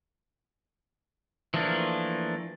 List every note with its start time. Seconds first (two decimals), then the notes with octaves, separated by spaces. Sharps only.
1.54 E3 F3 A3 A#3 D4